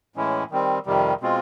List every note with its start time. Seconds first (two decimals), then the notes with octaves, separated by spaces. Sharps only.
0.16 A2 E3 G#3 C#4 E4
0.51 D#3 G3 C4
0.86 F2 C3 D#3 G3
1.21 B2 G#3 C4 F4